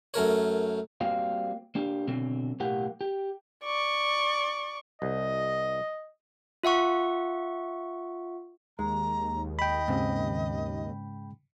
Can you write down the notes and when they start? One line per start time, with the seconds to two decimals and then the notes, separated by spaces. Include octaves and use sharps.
0.14 F#2 A3 A#4 C#5
1.01 G3 A#3 C4 F#4 F5
1.75 A#3 D4 G4
2.07 B2 D3 F#3 C4
2.60 B1 A2 A#3 G4 F#5
3.01 G4
3.64 D5 C#6
5.02 C2 D#5
6.63 F4 E5 F#5 C#6
8.79 D#2 G#3 A#5
9.59 D#5 G5 B5
9.88 G#2 C#3 C4